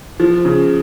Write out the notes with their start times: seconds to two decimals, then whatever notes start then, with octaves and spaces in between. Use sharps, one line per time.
0.20 F3
0.45 C#3